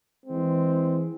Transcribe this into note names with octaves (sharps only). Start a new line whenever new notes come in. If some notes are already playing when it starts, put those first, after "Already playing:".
E3 G#3 C4